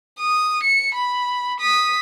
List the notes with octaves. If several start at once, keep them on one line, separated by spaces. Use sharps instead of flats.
D#6
C#7
B5
D#6 B6